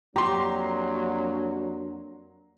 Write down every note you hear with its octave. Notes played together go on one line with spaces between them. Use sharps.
F2 F#3 A#3 D4 G4 A#5 C6